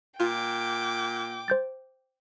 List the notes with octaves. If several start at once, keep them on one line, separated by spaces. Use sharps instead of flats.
A#2 F4 G5 D6
C5 G6 A6